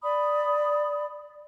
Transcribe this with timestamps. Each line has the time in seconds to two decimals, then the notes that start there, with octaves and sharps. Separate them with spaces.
0.02 D5 B5 D#6